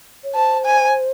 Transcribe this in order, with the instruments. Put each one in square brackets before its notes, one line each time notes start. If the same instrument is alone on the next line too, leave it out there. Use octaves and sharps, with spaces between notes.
[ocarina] C#5
[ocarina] C5 [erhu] A5
[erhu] G#5